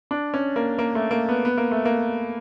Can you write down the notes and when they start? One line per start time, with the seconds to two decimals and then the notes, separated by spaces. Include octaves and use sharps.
0.11 D4
0.34 C#4
0.56 A#3
0.79 A#3
0.95 A3
1.11 A#3
1.29 B3
1.45 B3
1.57 A#3
1.71 A3
1.85 A#3